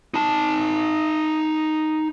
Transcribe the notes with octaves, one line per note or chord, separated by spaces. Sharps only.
D#4 A5